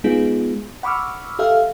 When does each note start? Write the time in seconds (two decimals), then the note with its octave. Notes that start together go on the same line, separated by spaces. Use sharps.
0.04 G#3 B3 D#4 F4 G#4
0.83 F#5 B5 C#6 D6 E6 F6
1.39 G4 A4 E5 F5 F6